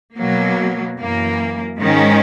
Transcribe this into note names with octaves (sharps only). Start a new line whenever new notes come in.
B2 F#3 A#3
F#2 E3 A#3
G#2 D#3 G#3 C#4